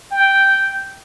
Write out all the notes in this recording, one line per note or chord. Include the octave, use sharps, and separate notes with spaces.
G5